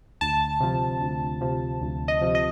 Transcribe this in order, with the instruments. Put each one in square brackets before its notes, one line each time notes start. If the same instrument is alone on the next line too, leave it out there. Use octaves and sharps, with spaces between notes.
[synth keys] D2 A5
C3 F3
D2
C3 F3
D2
D#5
C3 F3
D#5